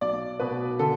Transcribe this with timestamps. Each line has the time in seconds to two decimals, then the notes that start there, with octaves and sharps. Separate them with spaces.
0.01 B1 D5
0.40 B2 B4
0.79 D3 A4